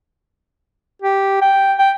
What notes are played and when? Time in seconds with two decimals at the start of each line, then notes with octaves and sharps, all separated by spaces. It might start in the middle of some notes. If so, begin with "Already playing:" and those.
1.02 G4
1.42 G5
1.78 G5